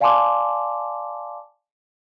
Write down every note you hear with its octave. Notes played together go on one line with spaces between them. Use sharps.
D5 F5 G#5 A5 C6 D6